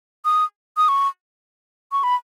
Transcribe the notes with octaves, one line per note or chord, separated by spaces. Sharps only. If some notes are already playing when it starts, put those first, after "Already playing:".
D#6
D#6
C#6
C#6
B5